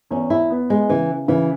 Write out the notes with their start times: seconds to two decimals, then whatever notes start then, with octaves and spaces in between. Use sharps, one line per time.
0.10 E2 C#4
0.30 E4
0.50 B3
0.70 G#3
0.89 C#3 E3
1.28 C#3 E3